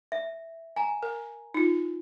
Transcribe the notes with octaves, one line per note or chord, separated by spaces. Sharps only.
E5
G#5 A#5
A#4
D#4 F4